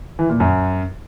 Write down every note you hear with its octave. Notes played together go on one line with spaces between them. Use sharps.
E3
A#2
F#2